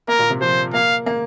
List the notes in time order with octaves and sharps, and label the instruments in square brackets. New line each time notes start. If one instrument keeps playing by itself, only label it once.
[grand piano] A#3 [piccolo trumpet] A#4
[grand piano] A#2
C3
[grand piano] F3 [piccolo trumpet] C5
[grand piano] A#3 [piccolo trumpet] F5
[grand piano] A#3